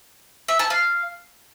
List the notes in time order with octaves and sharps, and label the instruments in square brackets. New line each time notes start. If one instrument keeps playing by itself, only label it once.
[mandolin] E5
A5
F5